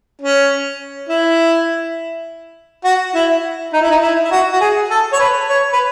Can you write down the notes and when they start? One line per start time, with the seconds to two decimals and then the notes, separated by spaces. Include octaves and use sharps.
0.21 C#4
1.09 E4
2.84 F#4
3.14 E4
3.73 D#4
3.81 E4
3.91 D#4
4.02 E4
4.25 E4
4.31 F#4
4.52 F#4
4.61 G#4
4.90 A4
5.13 C#5
5.20 B4
5.49 C#5
5.73 B4